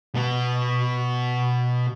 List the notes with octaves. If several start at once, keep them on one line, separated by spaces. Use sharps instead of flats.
B2 B3